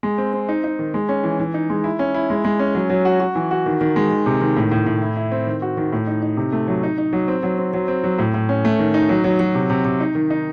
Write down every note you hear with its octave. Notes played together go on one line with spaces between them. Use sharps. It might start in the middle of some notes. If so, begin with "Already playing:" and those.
G#3
C4
C4
D#4
D#4
D#3
G#3
C#4
E3
E3
D#4
G#3
E4
C#4
E4
G#3
G#3
C#4
F#3
F#3
F#4
F#4
E3
F#4
D#3
D#3
G#3
D#3
C3
D#3
A2
A2
A2
E4
E4
C4
D#3
F#4
D#3
A2
D#4
D#4
C3
A3
F#3
D#4
D#4
F#3
C4
F#3
C4
F#3
C4
F#3
A2
A2
C#4
A3
D#3
D#4
F#3
F#3
F#3
C3
C3
C3
D#4
D#3
D#4